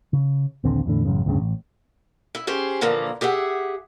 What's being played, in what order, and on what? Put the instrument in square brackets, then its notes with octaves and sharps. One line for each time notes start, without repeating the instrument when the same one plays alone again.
[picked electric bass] C#3
A#1 D#2 D3 C4
E2 A2 D3
A1 F#2 C#3
F#1 D2 G2 C#3
A1
[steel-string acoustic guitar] E4
C#4 G4 G#4 C5
A#2 D3 E3 F3 A#3
G4 G#4 E5 F#5